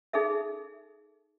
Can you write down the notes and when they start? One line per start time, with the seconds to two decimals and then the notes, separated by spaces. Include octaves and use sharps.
0.13 D#4 G#4 A4 E5